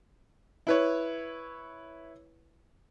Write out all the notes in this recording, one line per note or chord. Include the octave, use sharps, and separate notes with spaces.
E4 B4 C#5